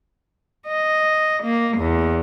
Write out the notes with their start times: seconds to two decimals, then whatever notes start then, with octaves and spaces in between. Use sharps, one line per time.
0.67 D#5
1.43 A#3
1.78 E2